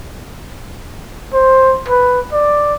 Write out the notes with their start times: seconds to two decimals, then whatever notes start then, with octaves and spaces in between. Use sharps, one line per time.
1.34 C5
1.88 B4
2.32 D5